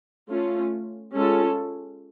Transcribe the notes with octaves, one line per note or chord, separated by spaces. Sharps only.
A3 C#4 F4
G#3 C#4 F4 A4